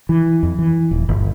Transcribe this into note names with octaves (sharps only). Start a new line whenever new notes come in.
E3
F2
E3
D#1
G1